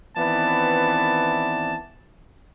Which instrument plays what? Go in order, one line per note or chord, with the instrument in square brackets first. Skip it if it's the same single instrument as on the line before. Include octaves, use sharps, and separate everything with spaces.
[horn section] D#3 E3 B3 C4 D5 A5